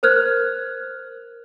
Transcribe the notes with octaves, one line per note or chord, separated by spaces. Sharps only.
A#4 C5 F6 F#6 G#6